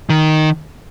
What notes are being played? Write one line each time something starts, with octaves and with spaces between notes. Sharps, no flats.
D#3